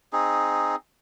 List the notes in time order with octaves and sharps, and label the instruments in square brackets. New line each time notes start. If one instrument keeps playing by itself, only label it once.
[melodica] C4 D#4 G#4